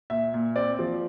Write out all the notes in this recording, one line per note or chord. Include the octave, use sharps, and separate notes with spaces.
A#2 E5
A#2
C4 D5
F3